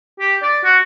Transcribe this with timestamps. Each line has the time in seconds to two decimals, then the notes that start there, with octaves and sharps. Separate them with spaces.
0.20 G4
0.43 D5
0.64 F#4